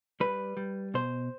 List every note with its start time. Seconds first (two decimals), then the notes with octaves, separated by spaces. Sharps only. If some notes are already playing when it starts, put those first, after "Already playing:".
0.20 G3 B4
0.57 G3
0.94 B2 C5